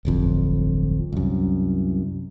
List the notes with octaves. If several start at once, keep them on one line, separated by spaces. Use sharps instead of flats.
D1 G1 F2
C2 F#2